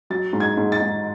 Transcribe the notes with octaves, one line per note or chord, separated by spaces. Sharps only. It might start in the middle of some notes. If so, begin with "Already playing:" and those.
F#3 A6
G#2
G#6
G#2
A6
G#2